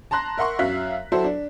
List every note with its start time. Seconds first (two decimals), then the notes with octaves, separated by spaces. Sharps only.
0.11 A5 A#5 C6 F#6 A#6
0.38 A#4 E5 F#5 C6 C#6
0.59 F#2 F#3 E5 F5 F#6 B6
1.12 F#3 E4 F#4 A4 C5
1.24 D4